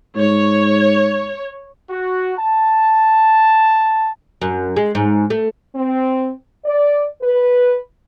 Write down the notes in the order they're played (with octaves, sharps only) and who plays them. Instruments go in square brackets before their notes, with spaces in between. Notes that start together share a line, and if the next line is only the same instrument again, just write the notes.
[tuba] G#2 [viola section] C#5
[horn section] F#4
A5
[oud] F#2
G#3
G#2
A3
[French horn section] C4
D5
B4